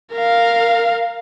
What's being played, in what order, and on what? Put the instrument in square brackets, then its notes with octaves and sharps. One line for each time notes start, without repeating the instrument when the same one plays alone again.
[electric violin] A#4 F5